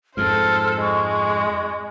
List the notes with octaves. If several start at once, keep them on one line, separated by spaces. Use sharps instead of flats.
F2 G#2 A4 C5 F6
G#3 C#6